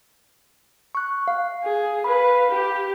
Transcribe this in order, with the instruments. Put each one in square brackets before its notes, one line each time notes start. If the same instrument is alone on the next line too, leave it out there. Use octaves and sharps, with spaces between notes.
[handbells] C#6 F#6
F5
[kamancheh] G#4
[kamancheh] B4 F5 [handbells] B5
[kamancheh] G4